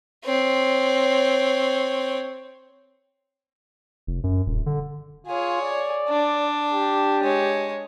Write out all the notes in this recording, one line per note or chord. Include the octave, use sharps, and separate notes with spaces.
C4 C#5
F1
F#2
D#1
D3
F4 G#4 C#5
D5
D4
G4
G#3 C#5